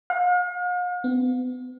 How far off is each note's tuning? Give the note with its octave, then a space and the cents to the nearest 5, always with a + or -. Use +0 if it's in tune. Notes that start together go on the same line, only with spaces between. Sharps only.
F5 +45
B3 +35